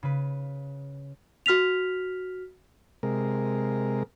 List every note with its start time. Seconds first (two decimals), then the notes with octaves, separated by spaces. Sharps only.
0.03 C#3 B4
1.46 F#4 F6 B6 F7
3.03 C3 G#3 A#4